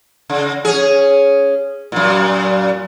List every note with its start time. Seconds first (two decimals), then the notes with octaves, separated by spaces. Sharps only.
0.30 C#3
0.65 C#4 G#4
1.92 F#2 A#2